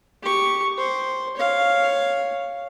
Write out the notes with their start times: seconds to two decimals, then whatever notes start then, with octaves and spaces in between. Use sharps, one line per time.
0.22 G4 C#6
0.78 C5
1.37 C#5 F5